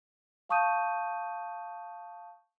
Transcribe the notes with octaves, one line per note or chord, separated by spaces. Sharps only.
F5 A5 C#6 D#6 G6 D#7